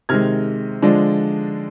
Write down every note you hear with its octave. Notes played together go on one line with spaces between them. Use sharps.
C3 D#3 G#3 F6 G#6
D3 F3 G#3 D4